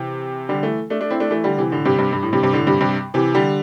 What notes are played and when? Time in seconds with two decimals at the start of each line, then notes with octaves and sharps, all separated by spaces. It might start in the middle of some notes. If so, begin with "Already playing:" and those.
Already playing: C3 E3
0.49 D3 G3
0.63 E3 A3
0.90 A3 D4
1.00 A3 D4
1.10 C4 E4
1.20 A3 D4
1.31 E3 A3
1.44 D3 G3
1.58 C3 E3
1.71 A2 D3
1.85 G2 C3
1.98 G2 C3
2.13 G2
2.23 A2
2.33 G2 C3
2.43 G2 C3
2.53 A2 D3
2.67 G2 C3
2.81 G2 C3
3.14 C3 E3
3.35 D3 G3